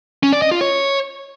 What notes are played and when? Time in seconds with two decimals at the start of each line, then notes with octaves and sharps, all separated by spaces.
0.23 C#4
0.32 D5
0.42 D#5
0.51 F4
0.61 C#5